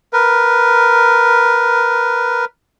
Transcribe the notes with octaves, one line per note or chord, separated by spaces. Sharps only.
A#4 B4